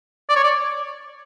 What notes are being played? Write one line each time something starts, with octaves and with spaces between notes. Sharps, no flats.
D5
C#5
D5